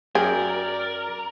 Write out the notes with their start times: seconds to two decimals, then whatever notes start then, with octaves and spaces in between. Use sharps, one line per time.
0.15 F#2 G#4 A#4 D5 G5